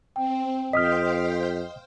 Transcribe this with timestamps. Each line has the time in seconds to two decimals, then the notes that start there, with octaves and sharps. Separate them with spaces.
0.16 C4 G5
0.73 F2 C5 D#5 F5 G5 D#6 F6 B6